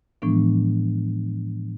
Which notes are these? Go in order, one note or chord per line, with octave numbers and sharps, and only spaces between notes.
A2 E3 F3 G#3 B3 D4